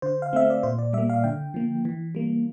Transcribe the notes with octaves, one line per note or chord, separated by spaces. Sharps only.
D3 C5
F5
A3 C4 E5
D5
A#2 C5
D5
G3 A#3 E5
F5
D3 G5
F3 A#3
E3
G3 A#3